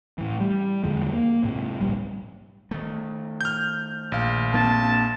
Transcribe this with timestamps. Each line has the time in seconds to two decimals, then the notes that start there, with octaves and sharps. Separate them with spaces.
0.18 A2 E3
0.40 G3
0.84 E2 D3 F3 G#3
1.12 A#3
1.43 G#2 C3
1.81 D1 A#1 G3
2.71 D#3 A3
3.41 F6 G6
4.12 A#1 F5
4.54 A#3 C4 D4 A5